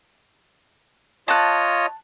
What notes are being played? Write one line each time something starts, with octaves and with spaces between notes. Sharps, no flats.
F4 C#5 D#5 A5 F#6